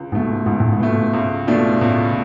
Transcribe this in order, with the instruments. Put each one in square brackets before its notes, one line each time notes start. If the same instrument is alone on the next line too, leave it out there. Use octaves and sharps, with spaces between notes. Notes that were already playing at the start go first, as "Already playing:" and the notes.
Already playing: [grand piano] C#2
[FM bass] G#2 [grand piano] B2 A3
[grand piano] C#2 [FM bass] G#2
[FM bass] A2
G#2
[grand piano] B2 A3
C#2
B2 A3 D4 F4
[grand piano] C#2 [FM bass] A2